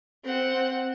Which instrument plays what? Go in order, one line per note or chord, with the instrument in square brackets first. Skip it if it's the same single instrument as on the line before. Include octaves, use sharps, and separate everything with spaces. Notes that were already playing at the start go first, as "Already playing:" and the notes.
[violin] C4 F#5